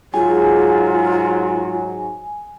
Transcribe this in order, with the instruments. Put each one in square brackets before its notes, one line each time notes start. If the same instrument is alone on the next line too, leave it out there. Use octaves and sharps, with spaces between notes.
[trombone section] G#2 F#3 [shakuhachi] F4 [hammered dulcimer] G#4 [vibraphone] G#5